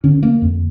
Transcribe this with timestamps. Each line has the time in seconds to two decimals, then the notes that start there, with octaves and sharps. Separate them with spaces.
0.04 D3 C#4
0.23 A#3
0.42 F2